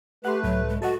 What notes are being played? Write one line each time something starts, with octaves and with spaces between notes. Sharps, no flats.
A3 G4 B4 F#5 C6
C#2 A2 F#3
G#3
F#4 A4 D#5 F#5